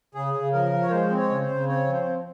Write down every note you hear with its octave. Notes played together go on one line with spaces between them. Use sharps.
C#3 G#4
C#3
F3 A#4
F3
C#5
G#3 C5
C4
C#5
C#3
C5
C#3
C4 C#5
F3
C5
C4